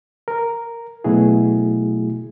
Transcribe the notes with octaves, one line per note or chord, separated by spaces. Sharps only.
A#4
B2 F#3 A3 E4 F#4 G#4